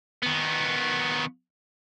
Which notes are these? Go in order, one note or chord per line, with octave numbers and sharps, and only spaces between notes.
D#3 B3